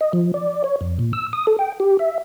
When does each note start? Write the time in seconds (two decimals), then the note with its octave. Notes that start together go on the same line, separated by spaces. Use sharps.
0.01 D#5
0.13 F3
0.34 D5
0.64 C#5
0.81 F2
0.99 A#2
1.13 E6
1.33 D#6
1.47 A4
1.59 G5
1.80 G4
1.99 E5